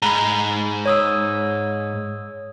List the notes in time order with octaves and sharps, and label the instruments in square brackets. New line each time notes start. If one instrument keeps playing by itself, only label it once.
[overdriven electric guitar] G#2 [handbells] A#5 B5
[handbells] C#5 D#6 E6